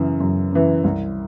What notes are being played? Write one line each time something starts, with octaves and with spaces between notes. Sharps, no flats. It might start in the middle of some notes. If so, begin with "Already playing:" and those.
Already playing: F#2 C#3 E3
F#2
C#3 E3
C2